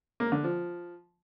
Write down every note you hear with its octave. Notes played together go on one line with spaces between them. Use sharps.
A#3
D3
F3